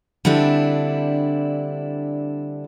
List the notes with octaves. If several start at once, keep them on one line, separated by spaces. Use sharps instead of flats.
D3 G3 C4 D4 E4